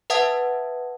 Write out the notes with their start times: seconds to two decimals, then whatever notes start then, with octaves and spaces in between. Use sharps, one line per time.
0.10 B4 E5 F#5 A5 D#6 G#6